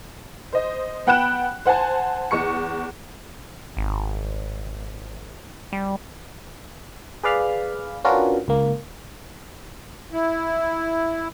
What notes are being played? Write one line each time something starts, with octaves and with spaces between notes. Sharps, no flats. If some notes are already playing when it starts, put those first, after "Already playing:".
C5 D#5
B3 F#5 G5 B5 F#6 E7
C5 F#5 G#5 A5
E2 C#6 C#7
G#1
G3
G#4 B4 D5 F5 B5 F6
C#4 D4 F4 F#4 A#4 B4
C#2 A#3
E4